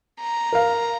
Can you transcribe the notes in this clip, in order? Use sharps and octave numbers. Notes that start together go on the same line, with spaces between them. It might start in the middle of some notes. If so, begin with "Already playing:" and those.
A#5
A#4 F5